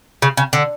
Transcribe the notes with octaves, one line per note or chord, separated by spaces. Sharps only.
C#3
C#3
D3